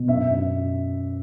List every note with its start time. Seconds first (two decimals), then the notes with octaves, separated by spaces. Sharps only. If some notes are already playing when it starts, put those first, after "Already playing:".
Already playing: B2
0.08 F#2 E5
0.30 F#2